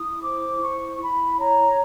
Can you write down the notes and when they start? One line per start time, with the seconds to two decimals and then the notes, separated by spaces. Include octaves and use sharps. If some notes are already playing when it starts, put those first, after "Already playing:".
Already playing: E4 D#6
0.23 C5 D6
0.61 E4 C#6
1.01 E4 B5
1.39 C#5 A#5